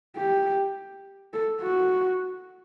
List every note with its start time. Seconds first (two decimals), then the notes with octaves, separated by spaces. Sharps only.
0.17 G4
1.34 A4
1.62 F#4